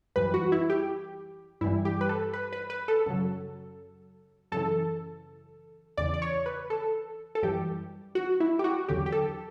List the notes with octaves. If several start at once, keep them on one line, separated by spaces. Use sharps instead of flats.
F#2 E3 G3 B4
F#4
E4
G4
G2 E3 G3 E4
G4
B4
A4
B4
B4
B4
A4
F#2 C#3 F#3
F#2 C#3 E3 A4
E2 C#3 E3 D5
D5
C#5
B4
A4
A4
F#2 E3 G3 G4
F#4
E4
G4
F#4
E2 D3 F#3 G4
G4
A4